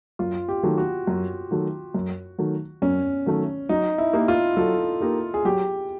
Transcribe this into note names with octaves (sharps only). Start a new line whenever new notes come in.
F#2 F4
G4
D#3 F#3 A3
F#4
F#2
D#3 F#3 A3
F#2
D#3 F#3 A3
F#2 C#4
D#3 F#3 A3
F#3 D#4
E4
A#3 D#4 G4 A#4
F4
F#3 A4
A#3 D#4 G4 A#4
G#4
F#3 G4